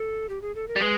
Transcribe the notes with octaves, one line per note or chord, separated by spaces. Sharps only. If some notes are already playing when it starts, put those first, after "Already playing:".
Already playing: A4
G4
G#4
A4
A#4
G3
G#3 B4